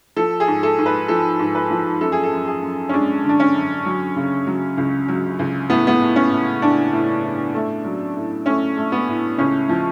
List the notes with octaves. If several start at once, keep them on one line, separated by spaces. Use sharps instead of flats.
F3 A4
G#4
G#2
A4
G#2
B4
F3 A4
G#2
B4
F3
F#2 A4
G#4
A4
F#2
G#4
F#2
C#4
G#3 D4
D3 D4
C#4
F#2
F#3
C#3
F#3
C#2
F#3
C#2
A2 B3
B3
A2
C#4
A2
A2 D4
A2
A2
A3
F#3
A2
A3 C#4
A3
B3
A2
C#2 C#4
F3